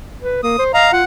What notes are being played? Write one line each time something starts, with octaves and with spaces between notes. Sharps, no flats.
B4
A#3 D#6
C5
D#5 F5 A#5
F4 F#5